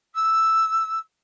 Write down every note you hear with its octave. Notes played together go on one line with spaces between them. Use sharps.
E6